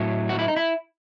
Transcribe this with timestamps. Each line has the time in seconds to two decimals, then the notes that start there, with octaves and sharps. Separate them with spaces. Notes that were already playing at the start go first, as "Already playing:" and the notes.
Already playing: A2 F#3 A3
0.29 F#4
0.39 E4
0.48 D#4
0.56 E4